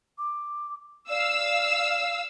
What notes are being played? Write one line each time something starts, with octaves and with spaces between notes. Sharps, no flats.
D6
D5 F5 E6